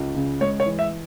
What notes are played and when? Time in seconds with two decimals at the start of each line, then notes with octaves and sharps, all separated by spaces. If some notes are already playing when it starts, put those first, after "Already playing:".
Already playing: C#2
0.15 C#3
0.41 G#3 C#5
0.60 C#5
0.66 E3
0.79 E5